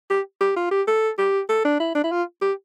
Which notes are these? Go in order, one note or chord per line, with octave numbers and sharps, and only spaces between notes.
G4
G4
F4
G4
A4
G4
A4
D4
E4
D4
E4
F4
G4